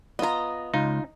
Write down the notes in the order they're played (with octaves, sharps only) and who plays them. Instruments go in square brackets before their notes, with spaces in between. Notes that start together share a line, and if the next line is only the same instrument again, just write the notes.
[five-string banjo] B3 F4 [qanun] D#5 A#5
[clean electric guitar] C#2 [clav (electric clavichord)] D#4 [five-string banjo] F4